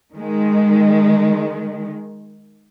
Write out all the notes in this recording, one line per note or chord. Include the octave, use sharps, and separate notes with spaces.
D#3 G#3